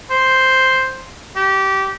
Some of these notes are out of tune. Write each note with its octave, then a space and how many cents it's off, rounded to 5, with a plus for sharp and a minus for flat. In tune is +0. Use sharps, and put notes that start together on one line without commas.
C5 +0
G4 -20